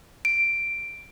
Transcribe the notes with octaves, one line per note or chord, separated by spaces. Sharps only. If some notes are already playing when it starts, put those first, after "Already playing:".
D7